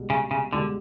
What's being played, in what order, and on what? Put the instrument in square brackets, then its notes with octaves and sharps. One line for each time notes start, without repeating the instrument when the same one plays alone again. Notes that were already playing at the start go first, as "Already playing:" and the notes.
Already playing: [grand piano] C#2 B2 G3
[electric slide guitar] C#3
C#3
[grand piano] C#2 B2 G3 [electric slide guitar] D3